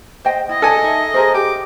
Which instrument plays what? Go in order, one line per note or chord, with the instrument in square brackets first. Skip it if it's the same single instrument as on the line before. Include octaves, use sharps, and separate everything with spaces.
[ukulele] C5 D#5 G5
[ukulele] E4 [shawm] D#5
[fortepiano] A4 G#5 [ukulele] D5
[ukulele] D#4 E5
G#4 A#4 C5
[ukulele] G4 [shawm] D6